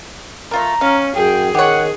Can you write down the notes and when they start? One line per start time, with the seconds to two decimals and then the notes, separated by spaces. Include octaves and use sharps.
0.51 A3 F4 A#4 A#5
0.81 C#4 F5
1.16 F#2 G#4 G5
1.54 D#3 G4 C#5 F#5